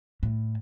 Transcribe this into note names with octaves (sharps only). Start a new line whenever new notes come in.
A2